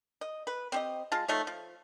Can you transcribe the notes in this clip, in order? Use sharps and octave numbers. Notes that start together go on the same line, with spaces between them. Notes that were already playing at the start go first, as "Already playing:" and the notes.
D#5
B4
C4 G4 D#5
G#3 F4 A5
F3 A3 D#4 C#5
F3